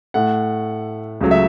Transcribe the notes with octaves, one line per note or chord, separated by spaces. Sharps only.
A2 A3 F#5
C#2 C#3 F#3 A3
E5